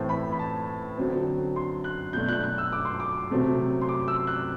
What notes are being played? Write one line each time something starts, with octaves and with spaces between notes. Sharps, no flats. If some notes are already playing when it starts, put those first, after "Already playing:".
Already playing: A2 E3 A3 C4 E4 C5
B5
B5
A5
D3 F#3 C4
C6
F#6
B2 F#3 A3 D4 G6
F#6
F#6
E6
D6
C6
D6
C3 F#3 A3 C4
C6
D6
E6
F#6